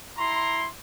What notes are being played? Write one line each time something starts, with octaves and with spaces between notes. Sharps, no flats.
E4 A#5 C6